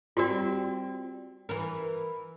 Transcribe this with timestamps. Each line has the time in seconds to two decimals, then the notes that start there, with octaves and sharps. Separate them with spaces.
0.17 G3 C4 F4 F#4 D5
1.49 E3 A#4